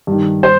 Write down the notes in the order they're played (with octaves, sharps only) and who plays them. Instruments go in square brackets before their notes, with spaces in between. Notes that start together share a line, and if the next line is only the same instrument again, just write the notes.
[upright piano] G2 D#3
C5